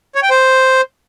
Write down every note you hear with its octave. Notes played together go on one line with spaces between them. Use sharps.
C#5
G5
C5